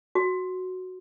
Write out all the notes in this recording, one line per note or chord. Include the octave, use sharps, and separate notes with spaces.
F#4